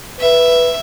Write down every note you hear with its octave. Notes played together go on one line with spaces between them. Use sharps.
B4 E5